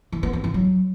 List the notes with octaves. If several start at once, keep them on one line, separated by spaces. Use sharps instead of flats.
E3
B3
C4
E3
F#3